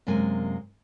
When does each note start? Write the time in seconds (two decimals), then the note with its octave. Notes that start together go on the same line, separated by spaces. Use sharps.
0.07 F#2 C3 G#3 A#3 G#5